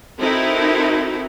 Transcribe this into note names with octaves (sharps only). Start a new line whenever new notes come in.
C4 D#4 E4 F#4 A4 A#4